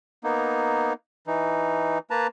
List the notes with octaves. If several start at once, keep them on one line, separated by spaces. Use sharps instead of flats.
A#3 B3 D#4
E3 D#4
A#3 B4 A5 A#5